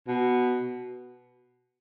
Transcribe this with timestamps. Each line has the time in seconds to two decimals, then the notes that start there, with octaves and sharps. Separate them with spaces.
0.08 B2